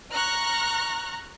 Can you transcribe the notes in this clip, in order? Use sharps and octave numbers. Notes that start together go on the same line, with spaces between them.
A#5 C#6 F6 F#6 A#6